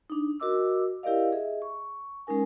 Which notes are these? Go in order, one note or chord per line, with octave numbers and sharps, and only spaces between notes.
D4 D#4
F#4 A#4 D#5 D6 E6
E4 G4 A#4 D5 D#5 F5
G#4 D#5 E5
C#6
G#3 C#4 D#4 A#4 G#5